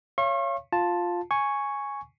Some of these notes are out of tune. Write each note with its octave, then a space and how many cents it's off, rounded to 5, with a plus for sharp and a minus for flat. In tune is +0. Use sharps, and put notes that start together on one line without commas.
C#5 +0 F5 -35 C#6 -40
F4 +5 A5 +0
G#5 +0 C#6 +0